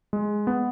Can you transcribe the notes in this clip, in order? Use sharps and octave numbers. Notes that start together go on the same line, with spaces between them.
G#3
B3